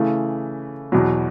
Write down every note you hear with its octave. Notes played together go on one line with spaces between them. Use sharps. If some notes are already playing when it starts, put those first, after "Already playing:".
Already playing: C#3 E3 A3
E2 B2 F#3